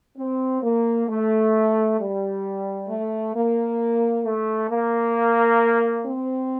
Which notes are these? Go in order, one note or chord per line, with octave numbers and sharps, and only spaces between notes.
C4
A#3
A3
G3
A3
A#3
A3
A#3
C4